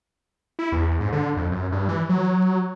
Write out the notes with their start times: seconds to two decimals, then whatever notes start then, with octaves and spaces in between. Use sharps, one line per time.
0.59 E4
0.72 E2
1.00 G#2
1.12 D3
1.37 F2
1.52 F#2
1.72 G2
1.89 E3
2.09 F#3